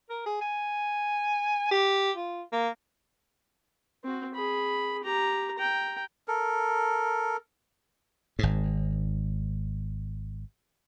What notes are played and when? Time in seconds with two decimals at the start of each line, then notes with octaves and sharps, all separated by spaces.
0.09 A#4
0.26 G#4
0.41 G#5
1.71 G4
2.17 F4
2.52 A#3
4.04 C4 F#4
4.34 G#4 B5
5.03 G4 A#5
5.58 G5 A#5
6.28 A4 A#4
8.39 G#1 G#2